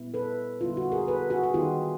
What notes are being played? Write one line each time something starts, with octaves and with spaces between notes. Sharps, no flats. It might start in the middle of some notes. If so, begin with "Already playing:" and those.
Already playing: A#2 G3 B3 E4
A4 B4
D3 G3 B3 E4 F4
F#4
G#4 A#4
A4 B4
F#4 G#4
G#4
D#3 G3 B3 D#4 F4 G4